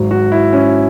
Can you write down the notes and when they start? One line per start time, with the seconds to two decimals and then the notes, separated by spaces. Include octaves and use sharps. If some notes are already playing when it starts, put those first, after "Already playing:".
Already playing: G#1 G#2 F#3
0.11 F#4
0.32 E4
0.53 C#4